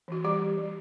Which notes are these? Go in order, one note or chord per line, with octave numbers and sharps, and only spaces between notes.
E3 F#4
G3 G4
G3
G3